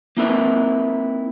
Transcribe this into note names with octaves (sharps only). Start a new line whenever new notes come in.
A#3 C4 D#4 E4 A#4 B4